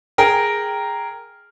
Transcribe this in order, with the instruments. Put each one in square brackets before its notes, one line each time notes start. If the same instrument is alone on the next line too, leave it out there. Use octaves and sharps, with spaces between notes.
[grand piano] G#4 A#4 G5